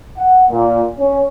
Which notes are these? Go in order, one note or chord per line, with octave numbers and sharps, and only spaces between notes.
F#5
A#2
C#4